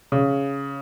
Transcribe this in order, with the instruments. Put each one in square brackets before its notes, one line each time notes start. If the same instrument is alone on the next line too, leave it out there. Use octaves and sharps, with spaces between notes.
[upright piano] C#3